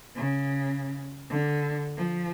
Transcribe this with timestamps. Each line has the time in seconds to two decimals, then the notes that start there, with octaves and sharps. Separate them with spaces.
0.16 C#3
1.30 D3
1.97 F3